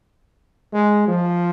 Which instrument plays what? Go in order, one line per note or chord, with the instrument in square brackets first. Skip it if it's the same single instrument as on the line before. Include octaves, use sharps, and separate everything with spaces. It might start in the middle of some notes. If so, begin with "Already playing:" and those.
[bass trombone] G#3
F3